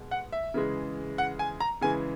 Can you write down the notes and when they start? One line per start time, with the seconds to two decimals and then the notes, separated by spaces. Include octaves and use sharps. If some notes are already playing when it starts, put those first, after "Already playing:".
Already playing: B2 G#3
0.11 F#5
0.32 E5
0.54 C#3 E3 G#3
1.18 F#5
1.39 G#5
1.60 A#5
1.81 C#3 E3 G#3 G#5